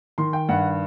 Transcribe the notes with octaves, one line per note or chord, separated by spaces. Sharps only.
D#3 C6
G5
G2 F#5